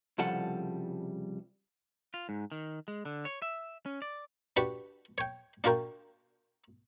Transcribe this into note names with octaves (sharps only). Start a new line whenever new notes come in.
C2 C#3 F3 G3 A4 F#5
F4
G#2
D#3
G#3
D3
C#5
E5
C#4
D5
D4 F#4 G4 B4 F#5
C#5 G5
D4 F4 F#4 A#4 G5